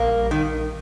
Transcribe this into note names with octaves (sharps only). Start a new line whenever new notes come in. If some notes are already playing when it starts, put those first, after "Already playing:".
Already playing: A#1 A#3
G3
G3
D#3